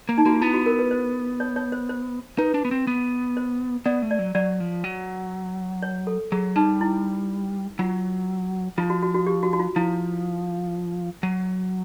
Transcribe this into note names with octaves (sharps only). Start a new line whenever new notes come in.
A#3
D#4
A#3 F#4
F4
B3 E4
F#4
A#4
B4
C5
C#5
C#5
C5
C5
D#4 B4
D4
B3
C4
B3
C5
B3 D5
A3
D5
F#3
F#3 D5
F3
F#3
C#5
A4
F#3 G#4
G3 D#4
E4
F#3 F4
F3 F4
F#4
F#4
F#4
G4
F#4
F#4
F4
F3 E4
F#3